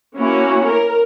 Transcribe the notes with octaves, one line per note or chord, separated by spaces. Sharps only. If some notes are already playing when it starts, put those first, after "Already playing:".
A#3 C#4 E4 F#4
A#4